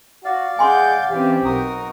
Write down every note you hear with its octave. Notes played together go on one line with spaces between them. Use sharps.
F#4 D5 F5
G#3 F#5 G#5 C6 D6 G6
E3 C4 C#4 G4
B1 D#4 F#4 A#4 D#6